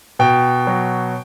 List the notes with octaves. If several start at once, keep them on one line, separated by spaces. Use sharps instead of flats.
B2 G5
F#3